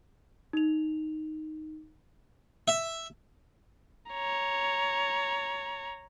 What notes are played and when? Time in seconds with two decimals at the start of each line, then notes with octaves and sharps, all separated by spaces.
0.53 D#4 F7
2.68 E5
4.11 C#5 A#5